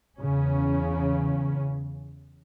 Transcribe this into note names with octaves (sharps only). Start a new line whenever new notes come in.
E2 C#3 C#4